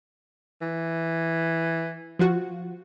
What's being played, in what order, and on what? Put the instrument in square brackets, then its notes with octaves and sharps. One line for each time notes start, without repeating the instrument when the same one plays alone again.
[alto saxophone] E3
[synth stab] F3 F4 F#4